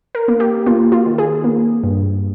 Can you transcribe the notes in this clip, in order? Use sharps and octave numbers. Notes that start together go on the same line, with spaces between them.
A#4
A#3
G4
A#3 F4
F4
D#3
G#4
A#3
G2